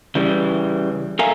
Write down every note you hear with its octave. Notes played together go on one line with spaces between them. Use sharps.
C#3 E3 G3
A4 A#4 E5 F5 G#5 A#5